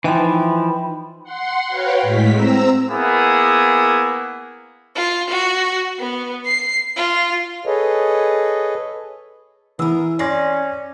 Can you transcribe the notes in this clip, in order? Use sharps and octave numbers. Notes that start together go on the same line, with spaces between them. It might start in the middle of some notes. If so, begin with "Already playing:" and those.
E3 F3 D#4 B4 G5 B5
F#5 C6
F#4 B4 C#5 F5 G5
A2 G#3 B6
C4 A#5 E6
A#3 B3 E4 G#4
F4
F#4
B3
C7
F4
G#4 A4 B4 C#5 D#5
E3 B3 G#4 A#4 E6
C#4 D5 C6 A#6 C7